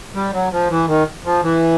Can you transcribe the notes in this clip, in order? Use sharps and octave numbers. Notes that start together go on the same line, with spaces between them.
G3
F#3
F3
E3
D#3
F3
E3